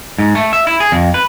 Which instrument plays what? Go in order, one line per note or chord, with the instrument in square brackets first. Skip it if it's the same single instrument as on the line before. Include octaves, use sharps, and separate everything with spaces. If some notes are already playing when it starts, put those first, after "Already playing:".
[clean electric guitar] G#2
A3
E5
E4
G#4
F2
B4